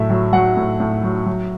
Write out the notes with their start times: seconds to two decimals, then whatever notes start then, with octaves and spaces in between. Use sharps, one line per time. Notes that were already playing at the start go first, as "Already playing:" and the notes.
Already playing: A2 F#3 A3 E5
0.10 F#3
0.33 F#3 F#5
0.57 A2
0.80 A2
1.03 F#3
1.26 F#3